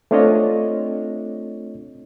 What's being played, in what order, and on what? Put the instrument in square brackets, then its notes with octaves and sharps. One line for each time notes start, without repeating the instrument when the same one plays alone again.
[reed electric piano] A3 C4 D4 F4 C#5 D#5